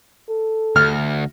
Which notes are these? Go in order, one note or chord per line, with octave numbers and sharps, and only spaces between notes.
A4
D2 F6